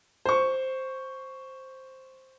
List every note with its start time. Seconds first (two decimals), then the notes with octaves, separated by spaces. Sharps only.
0.25 C5 C#6